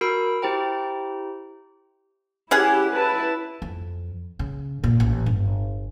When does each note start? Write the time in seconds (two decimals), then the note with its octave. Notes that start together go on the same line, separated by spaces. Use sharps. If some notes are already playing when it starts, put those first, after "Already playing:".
0.01 F#4 A#4 B5 E6 D7
0.42 E4 G4 C5 G5 A#5
2.51 C#4 E4 G4 G#4 F#5
2.92 E4 B4 A5
3.62 F2
4.39 C#3
4.84 A#2
5.00 A1
5.26 G1